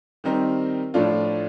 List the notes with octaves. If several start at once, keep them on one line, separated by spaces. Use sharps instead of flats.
D#3 G3 C4 D#4 A#4
A2 F3 A3 D4 F4